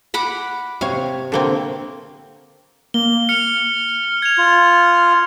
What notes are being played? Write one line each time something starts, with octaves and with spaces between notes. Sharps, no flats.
F#5 B5 D6
C3 C#5 F5
D3 A#3 C4
A#3 G7
F6 C#7
G#6 F7
F4